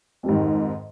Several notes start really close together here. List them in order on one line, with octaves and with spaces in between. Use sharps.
F2 G3 G#2 D#3